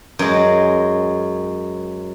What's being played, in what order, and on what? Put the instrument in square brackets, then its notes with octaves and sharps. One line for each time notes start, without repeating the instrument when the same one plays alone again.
[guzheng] F#2 G#3